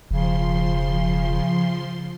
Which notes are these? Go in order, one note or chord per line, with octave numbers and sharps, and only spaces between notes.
E1 C#3 F3 C6